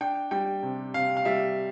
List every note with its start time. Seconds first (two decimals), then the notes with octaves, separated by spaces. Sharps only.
0.01 D4 G5
0.31 G3 G5
0.63 C3
0.94 C3 F5
1.17 F5
1.25 G3 E5